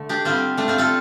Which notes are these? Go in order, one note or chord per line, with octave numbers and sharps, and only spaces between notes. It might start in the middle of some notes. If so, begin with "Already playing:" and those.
Already playing: D3 A3
D4 G4
D3 G3 C4 F4
A3 D4
C4 F4
F4 A4